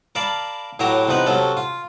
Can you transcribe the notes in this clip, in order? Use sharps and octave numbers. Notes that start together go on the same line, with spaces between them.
A#4 D5 F5 A5 B5
A2 E3 F#3 G4 E5 A#5
E2 C3 F3 D#4 B4 B5
C3 F#3 C#4 A4
F4